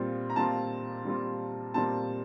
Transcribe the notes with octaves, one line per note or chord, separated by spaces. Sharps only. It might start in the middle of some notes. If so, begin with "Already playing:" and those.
Already playing: A#2 G3 C4 F4
A#5
A#2 G3 C4 F4 A5
A#2 G3 C4 F4
A#2 G3 C4 F4 A5